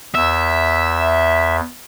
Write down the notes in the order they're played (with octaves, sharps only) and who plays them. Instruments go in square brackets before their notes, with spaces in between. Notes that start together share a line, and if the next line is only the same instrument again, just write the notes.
[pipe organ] E2 [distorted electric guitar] E5